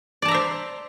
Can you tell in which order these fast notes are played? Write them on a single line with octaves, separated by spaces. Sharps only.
D5 A5 A#5 E5 C5